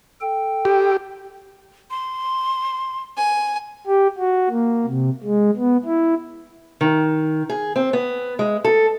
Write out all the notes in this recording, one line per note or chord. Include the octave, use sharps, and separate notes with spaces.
A4 G5
G4
C6
G#5
G4
F#4
A#3
C3
G#3
B3
E4
D#3
G#4
C4
B3
G#3
A4